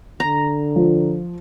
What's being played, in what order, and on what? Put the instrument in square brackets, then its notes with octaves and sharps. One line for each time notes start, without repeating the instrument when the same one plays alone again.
[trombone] D3 [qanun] A#5
[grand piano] F3